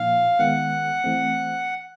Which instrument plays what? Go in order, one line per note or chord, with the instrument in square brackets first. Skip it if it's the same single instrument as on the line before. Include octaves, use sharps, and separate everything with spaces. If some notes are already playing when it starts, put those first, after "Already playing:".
Already playing: [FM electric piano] A#2 F3 A#3 D#4 [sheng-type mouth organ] F5
[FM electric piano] D#3 G#3 B3 [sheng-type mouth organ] F#5
[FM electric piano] E3 A3 C4